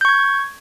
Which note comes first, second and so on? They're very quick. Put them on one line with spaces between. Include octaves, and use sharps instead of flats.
G6 C#6 G#6